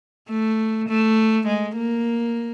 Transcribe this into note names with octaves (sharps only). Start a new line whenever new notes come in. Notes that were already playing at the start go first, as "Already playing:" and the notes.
A3
A3
G#3
A#3